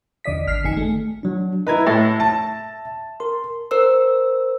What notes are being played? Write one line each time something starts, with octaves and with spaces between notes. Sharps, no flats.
E2 D3 D5 D#5 B6
G#1 F6 B6 C7
G1 F2 D#3 D#4 G#5 C#7
A3
F#3 D4
E4 B4 D#5 A#5 G#6
A2 E5 A6 A#6
A5
A#4 C6
A#4 C5 E6